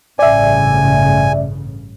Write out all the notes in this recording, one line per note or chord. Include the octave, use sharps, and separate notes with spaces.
A1 G2 C#3 D5 E5 G#5